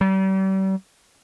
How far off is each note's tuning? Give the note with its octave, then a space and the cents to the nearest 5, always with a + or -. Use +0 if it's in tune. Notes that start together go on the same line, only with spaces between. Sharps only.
G3 -40